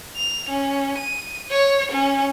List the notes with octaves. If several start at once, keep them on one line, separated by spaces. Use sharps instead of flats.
F7
C#4
D#7
C#5
C#4